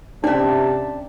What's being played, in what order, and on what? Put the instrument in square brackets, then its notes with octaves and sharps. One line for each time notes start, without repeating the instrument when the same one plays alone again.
[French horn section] C3 [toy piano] C#4 D4 [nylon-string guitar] D5 E5 [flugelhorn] A5